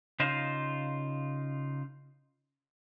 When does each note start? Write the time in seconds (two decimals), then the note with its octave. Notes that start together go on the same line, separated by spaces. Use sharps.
0.20 C#3 D#4 F4 C5